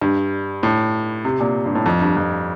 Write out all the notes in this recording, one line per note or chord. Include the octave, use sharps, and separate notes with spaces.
G2
A2
C3
A#2
G2
A2
F2
G2
F2